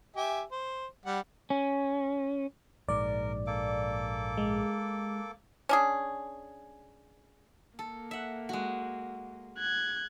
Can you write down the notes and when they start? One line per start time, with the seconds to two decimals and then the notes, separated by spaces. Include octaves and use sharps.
0.16 G4 E5 G#5
0.52 C5
1.06 G3 F#5
1.50 C#4
2.89 A#1 G#2 A#4 D5
3.47 A#3 A4 D6
4.37 G#3
5.69 C#4 D4 G#4
7.79 A#3 A4
8.11 E5 F#5
8.49 G#3 F#4
9.58 F#6 G#6